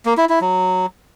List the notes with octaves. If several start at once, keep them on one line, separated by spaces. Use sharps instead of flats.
A#3
E4
E4
F#3